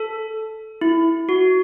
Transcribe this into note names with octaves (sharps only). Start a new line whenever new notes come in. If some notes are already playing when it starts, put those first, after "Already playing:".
Already playing: A4
E4
F#4